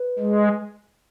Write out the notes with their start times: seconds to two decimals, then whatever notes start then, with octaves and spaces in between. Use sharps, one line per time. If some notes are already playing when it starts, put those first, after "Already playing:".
Already playing: B4
0.19 G#3